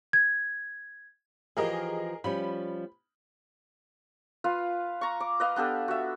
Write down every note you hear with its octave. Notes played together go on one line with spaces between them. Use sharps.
G#6
E3 F3 G4 G#4 A#4 D#5
F3 G3 C#4 B5
F4 B4 F5
A#5 C#6
D6
B4 D#5 F5
B3 D4 G4 A4
F#4 E5